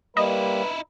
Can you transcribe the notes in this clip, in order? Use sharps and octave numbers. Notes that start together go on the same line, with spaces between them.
G3 A#3 D#4 E4 B4 D#5